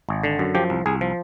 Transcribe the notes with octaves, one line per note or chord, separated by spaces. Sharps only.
G#1
D3
F#2
F3 G4
C2
C2 G#4
F3